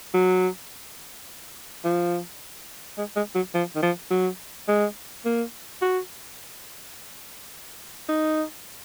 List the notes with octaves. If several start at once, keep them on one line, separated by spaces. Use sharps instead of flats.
F#3
F3
G#3
G#3
F#3
F3
D#3
F3
F#3
G#3
A#3
F#4
D#4